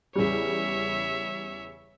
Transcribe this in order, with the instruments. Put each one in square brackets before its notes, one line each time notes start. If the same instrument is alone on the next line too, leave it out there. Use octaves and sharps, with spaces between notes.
[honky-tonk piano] E2 C#3 G3 [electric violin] C#5 E5